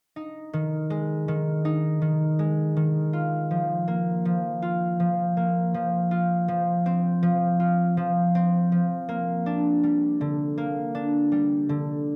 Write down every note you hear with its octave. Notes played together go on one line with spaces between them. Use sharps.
D#4
D#3
G#3
D#3
D#4
D#3
G#3
D#3
F4
F3
A#3
F3
F4
F3
A#3
F3
F4
F3
C4
F3
F4
F3
C4
F3
A#3
D4
G3
D3
A#3
D4
G3
D3